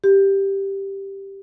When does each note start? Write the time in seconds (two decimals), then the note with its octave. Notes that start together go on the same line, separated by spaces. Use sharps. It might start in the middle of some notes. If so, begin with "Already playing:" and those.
0.04 G4